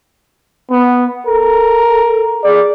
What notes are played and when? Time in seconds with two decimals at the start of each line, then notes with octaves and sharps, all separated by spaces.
0.71 B3
1.26 A4 A#4
2.43 G#4 D5